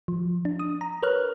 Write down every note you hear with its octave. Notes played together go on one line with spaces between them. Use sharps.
F3
D4
D#6
A#5
A#4 B4 C#5 F6 F#6